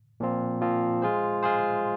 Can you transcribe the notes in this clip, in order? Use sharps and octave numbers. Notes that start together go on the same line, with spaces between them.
A#2 F3 C4 F4
A#2 F3 C4 F4
G#3 F4 G#4 C5
G#3 F4 G#4 C5